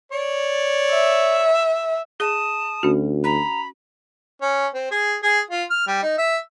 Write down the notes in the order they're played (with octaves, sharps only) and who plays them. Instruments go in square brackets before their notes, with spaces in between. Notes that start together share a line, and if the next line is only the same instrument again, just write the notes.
[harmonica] C#5 D5
[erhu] E5
[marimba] G#4 [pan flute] A5 [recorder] D#6
[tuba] D2 [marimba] C#4 F#4
[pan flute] A#5 [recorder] B5
[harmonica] C#4
C4
G#4
G#4
F4
F6
G3
D#4
E5